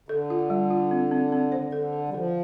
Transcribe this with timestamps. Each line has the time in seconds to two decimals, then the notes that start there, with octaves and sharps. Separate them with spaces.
0.09 D3 A4
0.30 F4
0.50 G3
0.70 F4
0.91 C4
1.11 C4
1.32 C4
1.52 C5
1.72 D3 A4
1.93 A4
2.09 G3
2.14 F3 A4